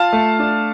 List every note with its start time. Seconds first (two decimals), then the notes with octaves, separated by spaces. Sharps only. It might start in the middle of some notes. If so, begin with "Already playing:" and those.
Already playing: F4 F5 A5
0.13 A3
0.39 D4